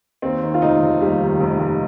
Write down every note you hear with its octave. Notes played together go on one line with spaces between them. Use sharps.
D#2 C4
D#3
F4
F1 D#4
F1
D#2 G3
D#3
F1
F1